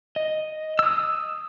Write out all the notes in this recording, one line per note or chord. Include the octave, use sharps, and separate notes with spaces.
D#5
D#6 E6